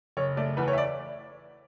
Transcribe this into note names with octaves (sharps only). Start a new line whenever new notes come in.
F#1 C#5
A3 D5
E2 B4
C#5
E5
D5